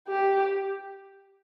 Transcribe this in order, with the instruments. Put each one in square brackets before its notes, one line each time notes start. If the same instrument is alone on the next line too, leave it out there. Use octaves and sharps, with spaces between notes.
[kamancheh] G4